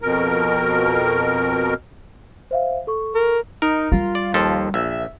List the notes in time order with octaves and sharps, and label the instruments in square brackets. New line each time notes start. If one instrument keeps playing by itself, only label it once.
[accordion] F2 B2 A#4
[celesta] C5 E5 F5
A4 C#6
[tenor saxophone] A#4
[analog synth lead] D#4 [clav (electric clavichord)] A#4
[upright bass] G3 [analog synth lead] F4
[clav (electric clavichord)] D5
D#2 F3 A4
[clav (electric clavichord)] A#1 [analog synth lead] E5